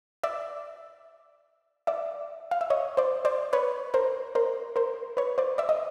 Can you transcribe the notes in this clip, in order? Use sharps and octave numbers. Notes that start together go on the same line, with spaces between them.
D5 E5
D5 E5
F5
E5
C#5 D#5
C5 D5
C5 D5
B4 C#5
A#4 C5
A#4 C5
A#4 C5
B4 C#5
C5 D5
D5 E5
D#5